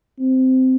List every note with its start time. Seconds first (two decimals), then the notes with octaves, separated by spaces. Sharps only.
0.19 C4